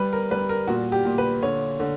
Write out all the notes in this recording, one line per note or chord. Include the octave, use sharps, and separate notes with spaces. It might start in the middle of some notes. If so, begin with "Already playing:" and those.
Already playing: G3 B4
A#4
G3 B4
A#4
A#2 F#4
G4
A#2
B4
D3 C#5
D3